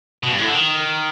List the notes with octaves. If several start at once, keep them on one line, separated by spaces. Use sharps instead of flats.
B2
G2
A2
D3
D#3